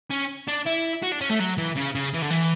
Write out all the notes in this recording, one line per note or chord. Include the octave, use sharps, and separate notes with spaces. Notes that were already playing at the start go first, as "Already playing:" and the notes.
C#4
D4
E4
F#4
D4
C#4
A3
F#3
E3
C#3
C#3
E3
D3
E3